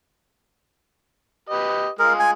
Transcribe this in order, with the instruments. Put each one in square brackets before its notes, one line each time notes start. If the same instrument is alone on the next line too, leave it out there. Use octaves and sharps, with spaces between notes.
[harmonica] G4 B4 D#5
[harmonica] G#3 F4 [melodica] A#4
[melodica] G#5